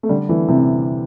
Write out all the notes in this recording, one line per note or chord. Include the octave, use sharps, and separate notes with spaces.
A3
D3 G3
E3 A3
C3 E3